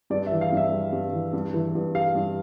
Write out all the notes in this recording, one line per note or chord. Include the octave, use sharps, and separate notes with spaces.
G2 D5
E5
E3
F5
G2 E5
G3
G2
E3
G2
E3
G2
G3 F5
G2